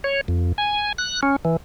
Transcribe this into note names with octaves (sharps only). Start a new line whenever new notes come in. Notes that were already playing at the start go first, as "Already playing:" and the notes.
C#5
F2
G#5
F#6
C#4
E3